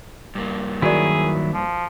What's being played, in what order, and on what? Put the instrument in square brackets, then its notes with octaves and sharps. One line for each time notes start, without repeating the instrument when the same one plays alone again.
[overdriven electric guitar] G2 A#3
[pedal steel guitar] D#3 F#3 E4 [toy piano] F#4 A#4 D5 [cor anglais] G#4
[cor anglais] F3